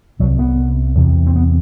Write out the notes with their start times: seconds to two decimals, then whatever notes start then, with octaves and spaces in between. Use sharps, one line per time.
0.19 C2 C3 F#3
0.39 B3
0.97 E2 C3
1.27 C4
1.36 B3